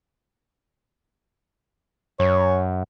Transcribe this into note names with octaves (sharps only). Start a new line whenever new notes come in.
F#2 C#5